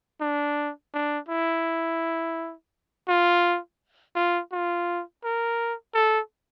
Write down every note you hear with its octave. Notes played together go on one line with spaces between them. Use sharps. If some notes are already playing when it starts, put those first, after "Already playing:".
D4
D4
E4
F4
F4
F4
A#4
A4